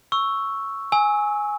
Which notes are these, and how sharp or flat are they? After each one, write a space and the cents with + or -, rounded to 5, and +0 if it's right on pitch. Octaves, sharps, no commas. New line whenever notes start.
C#6 +0 E6 +0
G#5 +0 E6 -30